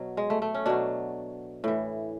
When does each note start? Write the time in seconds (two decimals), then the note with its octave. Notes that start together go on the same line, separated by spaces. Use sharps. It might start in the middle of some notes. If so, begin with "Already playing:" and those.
Already playing: B2 F#3
0.17 G#3
0.30 A3
0.42 A3
0.55 C#4
0.66 B2 F#3 D4
1.64 A2 E3